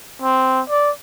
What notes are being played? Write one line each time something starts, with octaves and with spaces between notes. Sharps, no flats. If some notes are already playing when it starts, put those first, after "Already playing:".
C4
D5